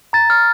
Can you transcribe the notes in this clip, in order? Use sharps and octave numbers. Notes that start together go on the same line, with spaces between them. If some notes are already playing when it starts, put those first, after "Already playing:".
A#5 A6
F6